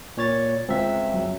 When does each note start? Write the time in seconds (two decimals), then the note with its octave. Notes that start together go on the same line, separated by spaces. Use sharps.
0.17 A#2 C#5 A6
0.69 C#2 C4 E5
1.14 F#2